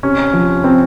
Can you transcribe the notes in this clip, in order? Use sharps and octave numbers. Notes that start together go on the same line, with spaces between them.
C3 C#4
F3
C3 C4